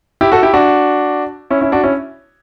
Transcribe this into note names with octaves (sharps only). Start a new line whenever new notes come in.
E4 G4
F#4 A4
E4 G4
D4 F#4
C#4 E4
C#4 E4
D4 F#4
C#4 E4